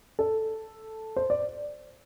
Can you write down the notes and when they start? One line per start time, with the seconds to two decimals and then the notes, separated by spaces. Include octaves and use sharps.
0.19 A4
1.16 C5
1.30 D5